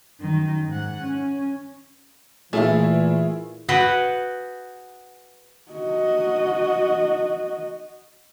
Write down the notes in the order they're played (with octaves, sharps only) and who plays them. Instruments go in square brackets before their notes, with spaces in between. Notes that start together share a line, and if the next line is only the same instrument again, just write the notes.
[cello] F#2 D#3
G#2 F#5
C#4
[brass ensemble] A#2 E3 [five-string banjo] A3 [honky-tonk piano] E4 F4 G#4
[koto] F#4 G#4 B4 F#5 G5
[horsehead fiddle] F#4 D#5